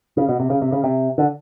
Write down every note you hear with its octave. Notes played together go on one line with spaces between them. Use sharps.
C#3
B2
C3
C#3
C3
C#3
C3
D3